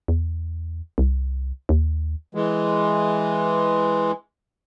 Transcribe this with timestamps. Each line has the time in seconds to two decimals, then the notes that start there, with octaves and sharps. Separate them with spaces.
0.08 E2
0.98 C2
1.69 D#2
2.35 E3 G#3